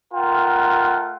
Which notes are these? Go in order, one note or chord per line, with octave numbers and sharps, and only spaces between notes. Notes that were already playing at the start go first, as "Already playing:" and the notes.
A3 F4 A#4 F#5 G5